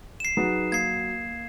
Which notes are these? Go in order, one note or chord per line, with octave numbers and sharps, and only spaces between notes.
C7 E7
F#3 D#4 G#4 B4
A#3 G#6 C7